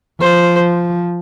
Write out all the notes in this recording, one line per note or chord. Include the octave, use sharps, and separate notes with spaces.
F3 C5